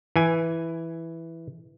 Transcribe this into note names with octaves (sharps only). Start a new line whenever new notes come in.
E3 G#5